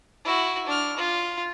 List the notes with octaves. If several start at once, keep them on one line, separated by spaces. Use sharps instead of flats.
E4 F#4
D4 F6
F4